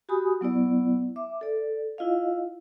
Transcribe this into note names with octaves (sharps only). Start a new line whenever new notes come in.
F#4 G4 G#5 B5 D#6
F#3 B3 E4 D5
E5 D6
A4 D5
E4 F4 D#5 F5